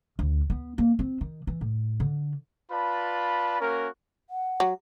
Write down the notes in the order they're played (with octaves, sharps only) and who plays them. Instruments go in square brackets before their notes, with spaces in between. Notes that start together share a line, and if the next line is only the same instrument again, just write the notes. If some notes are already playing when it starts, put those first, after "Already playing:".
[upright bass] D2
B3
A#3
C4
D#3
E3
A2
D3
[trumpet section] F4 B4 D5 A5 B5
A#3 C#4 F#4 A#4
[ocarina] F#5
[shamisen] F#3